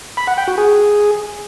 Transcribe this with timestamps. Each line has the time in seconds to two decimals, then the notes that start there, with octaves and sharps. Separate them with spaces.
0.17 B5
0.27 F#5
0.37 G5
0.48 F#4
0.58 G#4